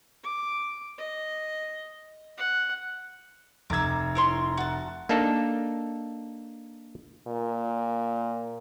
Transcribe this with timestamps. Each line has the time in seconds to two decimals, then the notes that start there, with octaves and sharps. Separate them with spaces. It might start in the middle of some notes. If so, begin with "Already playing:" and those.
0.24 D6
0.98 D#5
2.37 F#5
3.70 F1 A#5 D6 E6 G#6
4.15 E4 C#5 C6
4.57 F#4 A5
5.09 A#3 D4 D#4 A4
7.27 A#2